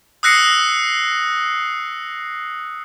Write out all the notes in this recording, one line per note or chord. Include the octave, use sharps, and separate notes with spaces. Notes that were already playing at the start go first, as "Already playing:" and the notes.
D#6 E6 F#6 A#6 C7 C#7